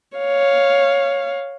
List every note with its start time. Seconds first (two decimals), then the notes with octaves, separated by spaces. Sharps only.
0.17 C#5 F5